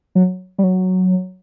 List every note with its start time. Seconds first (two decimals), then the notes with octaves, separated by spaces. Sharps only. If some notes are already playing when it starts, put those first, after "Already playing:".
0.15 F#3
0.58 G3
0.63 F#3